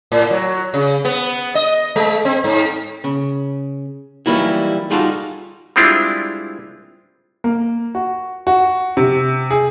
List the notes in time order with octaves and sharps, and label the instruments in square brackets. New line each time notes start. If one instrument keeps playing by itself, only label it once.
[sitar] A2
F#3
C#3
B3
D#5
G#3
C4
G#2
[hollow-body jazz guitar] C#3
E3 F#3 G3 A#3 D#4 E4
G3 D#4 F4 F#4 G#4 A4
[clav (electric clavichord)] G3 G#3 C4 D4 E4 F4
[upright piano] A#3
F#4
F#4
C3
G#4